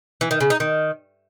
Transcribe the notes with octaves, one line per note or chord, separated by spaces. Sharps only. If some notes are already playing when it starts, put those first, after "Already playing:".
E3
D#3
C#3
D#4
D#3